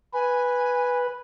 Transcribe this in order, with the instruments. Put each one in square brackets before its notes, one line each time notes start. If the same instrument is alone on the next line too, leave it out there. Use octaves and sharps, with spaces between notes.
[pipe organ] B4 [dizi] G#5